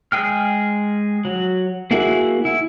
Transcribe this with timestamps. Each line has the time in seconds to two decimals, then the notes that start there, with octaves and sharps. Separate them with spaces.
0.12 G#3 G#4 G5 F6
1.25 F#3
1.91 A#3 E4 F#4 G#4
2.45 E4